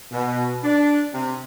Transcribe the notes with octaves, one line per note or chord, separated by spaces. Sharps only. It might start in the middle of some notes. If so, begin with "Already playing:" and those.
B2
D4
C3